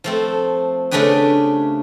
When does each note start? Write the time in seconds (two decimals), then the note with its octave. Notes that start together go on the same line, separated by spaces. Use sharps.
0.04 F3 A3 C4
0.91 C#3 A3 C#4 D4 G4 B4